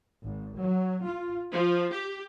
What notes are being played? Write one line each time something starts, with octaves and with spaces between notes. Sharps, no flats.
G#1
F#3
F4
F3
G4